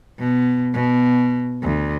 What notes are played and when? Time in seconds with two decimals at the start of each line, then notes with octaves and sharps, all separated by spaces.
0.19 B2
0.73 B2
1.63 D2